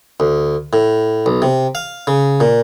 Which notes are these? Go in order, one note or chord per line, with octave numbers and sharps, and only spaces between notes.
D2
A2
B1
C3
F5
C#3
A#2